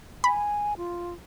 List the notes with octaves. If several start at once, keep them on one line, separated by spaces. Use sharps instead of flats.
G#5 B5
F4